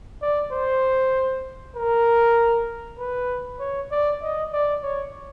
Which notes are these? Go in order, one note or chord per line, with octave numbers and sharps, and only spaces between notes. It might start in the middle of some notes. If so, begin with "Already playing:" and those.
D5
C5
A#4
B4
C#5
D5
D#5
D5
C#5